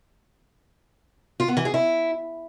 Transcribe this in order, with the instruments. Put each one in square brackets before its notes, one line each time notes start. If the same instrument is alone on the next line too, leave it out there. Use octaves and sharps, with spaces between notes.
[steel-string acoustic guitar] F4
B3
E3
G#4
E4